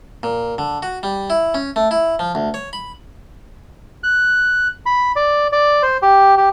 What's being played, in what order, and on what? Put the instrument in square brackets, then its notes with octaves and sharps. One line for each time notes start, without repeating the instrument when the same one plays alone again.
[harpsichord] A#2
D3
F#4
G3
E4
C#4
A3
E4
F3
D2
C#5
B5
[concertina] F#6
B5
D5
D5
C5
G4
G4